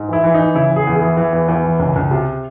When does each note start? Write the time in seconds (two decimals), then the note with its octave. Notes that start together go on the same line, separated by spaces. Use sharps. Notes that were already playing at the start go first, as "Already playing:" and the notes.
Already playing: G#2
0.09 E3 E4
0.24 E3
0.34 E3 D#4
0.55 C#3 E4
0.71 E3
0.76 G#4
0.87 E2
0.96 G#4
1.02 E3
1.17 E3
1.33 E2
1.48 E2
1.64 E3
1.80 C#2
1.96 C#2
2.11 C3